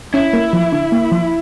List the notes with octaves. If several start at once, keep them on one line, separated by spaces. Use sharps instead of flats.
C#4 E4
A#3
F3
D3
A#3
F3